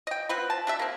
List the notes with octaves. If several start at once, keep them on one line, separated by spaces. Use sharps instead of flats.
D#5 G5
B3 C4 F4 B4
A5
D4 G4 E5
A#3 C4